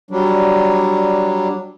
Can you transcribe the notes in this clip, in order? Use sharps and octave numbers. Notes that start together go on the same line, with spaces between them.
F#3 G3 D4